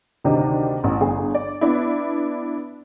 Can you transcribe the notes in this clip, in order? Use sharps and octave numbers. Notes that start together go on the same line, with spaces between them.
D2 C3 D#3 D4 D#4
A1
G1 G#4
D5
B3 D4 E4